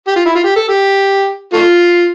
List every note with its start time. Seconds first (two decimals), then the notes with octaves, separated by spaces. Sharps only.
0.07 G4
0.16 F4
0.25 E4
0.35 F4
0.44 G4
0.56 A4
0.69 G4
1.53 A3 F4